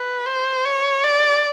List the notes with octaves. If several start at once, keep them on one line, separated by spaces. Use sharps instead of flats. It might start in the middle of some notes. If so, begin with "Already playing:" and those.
Already playing: B4
C5
C#5
D5